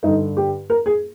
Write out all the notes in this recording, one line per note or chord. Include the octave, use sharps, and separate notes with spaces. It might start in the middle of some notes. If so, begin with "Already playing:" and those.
G2 D3 D#4
G4
A#4
G#4